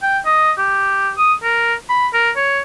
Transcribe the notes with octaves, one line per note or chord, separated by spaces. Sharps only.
G5
D#5
G4
D#6
A#4
B5
A#4
C#5